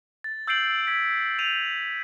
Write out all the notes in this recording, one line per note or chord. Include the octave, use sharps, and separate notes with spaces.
A6
E6 G6 A6 C7 D7 F#7
E6 G#6 B6 D7
G6 D#7 F7